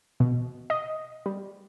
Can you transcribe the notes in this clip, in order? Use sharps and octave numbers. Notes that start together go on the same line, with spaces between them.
B2
D#5
G3